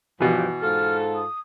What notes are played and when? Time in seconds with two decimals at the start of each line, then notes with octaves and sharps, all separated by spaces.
0.20 G2 B2 E3 F3 G4
0.61 G#2 F4 A4 F6
1.15 D#6